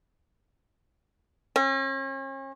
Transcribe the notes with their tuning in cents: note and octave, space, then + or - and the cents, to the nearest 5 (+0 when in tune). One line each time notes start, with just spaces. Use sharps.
C#4 -40